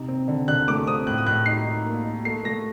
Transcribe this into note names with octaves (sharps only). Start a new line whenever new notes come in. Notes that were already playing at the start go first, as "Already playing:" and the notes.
Already playing: C3 D#4
C4
D3
D3 F#6
A3 D6
C4 D#6
A2 F#6
D#6
A2 F#6
D#4 C7
D#4
A#3
D#4
A3 C7
A3 A#6